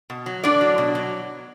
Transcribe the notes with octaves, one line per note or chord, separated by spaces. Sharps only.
B2
F#3
A2 D4 D5
F#3
B2
F#3